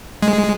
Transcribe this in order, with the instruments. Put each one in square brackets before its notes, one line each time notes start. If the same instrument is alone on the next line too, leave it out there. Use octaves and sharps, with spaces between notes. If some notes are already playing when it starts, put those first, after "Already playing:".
[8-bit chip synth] G#3